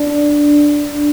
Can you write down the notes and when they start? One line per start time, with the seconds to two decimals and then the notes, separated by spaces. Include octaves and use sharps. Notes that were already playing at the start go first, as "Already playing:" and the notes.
Already playing: D4